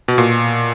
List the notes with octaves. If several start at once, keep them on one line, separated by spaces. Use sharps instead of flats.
B2
A#2